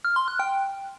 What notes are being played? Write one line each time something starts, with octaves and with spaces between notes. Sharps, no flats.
F6
C6
F#6
G5